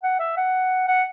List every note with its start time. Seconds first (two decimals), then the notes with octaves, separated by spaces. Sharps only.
0.03 F#5
0.20 E5
0.37 F#5
0.88 F#5